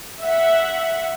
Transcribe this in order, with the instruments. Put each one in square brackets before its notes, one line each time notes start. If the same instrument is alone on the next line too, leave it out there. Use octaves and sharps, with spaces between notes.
[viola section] E5 F#5